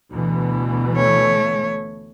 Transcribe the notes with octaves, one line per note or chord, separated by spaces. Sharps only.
D2 B2 E3
A3 C#5